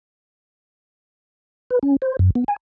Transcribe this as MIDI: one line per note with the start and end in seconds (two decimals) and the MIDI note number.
1.70 1.79 71
1.83 1.96 61
2.02 2.17 72
2.19 2.30 42
2.35 2.44 59
2.48 2.56 80